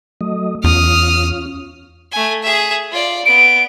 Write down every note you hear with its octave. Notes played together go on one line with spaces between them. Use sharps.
F#3 A3 D#5
E2 C#4 F4 D#6 F6
A3 G#5
G#4 E5
F4 D5
B3 D7